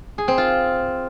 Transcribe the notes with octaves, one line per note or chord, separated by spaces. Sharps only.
G#4
C4
F4